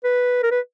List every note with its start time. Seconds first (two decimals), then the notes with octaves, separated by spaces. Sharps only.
0.04 B4
0.43 A#4
0.51 B4